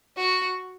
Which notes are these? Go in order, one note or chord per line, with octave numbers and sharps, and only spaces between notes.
F#4